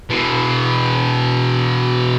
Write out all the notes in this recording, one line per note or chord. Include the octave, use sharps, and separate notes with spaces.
B2 E3